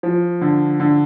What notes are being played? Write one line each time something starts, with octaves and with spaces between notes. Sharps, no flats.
F3
D3
D3